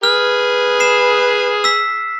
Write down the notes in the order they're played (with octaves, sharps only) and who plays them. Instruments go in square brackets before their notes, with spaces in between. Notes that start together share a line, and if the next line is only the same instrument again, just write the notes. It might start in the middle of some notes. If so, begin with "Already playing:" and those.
[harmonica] G#4 B4 [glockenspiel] F6
[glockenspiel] C7 E7
E6 B6